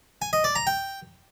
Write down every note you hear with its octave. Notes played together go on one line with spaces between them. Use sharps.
G#5
D#5
D5
A#5
G5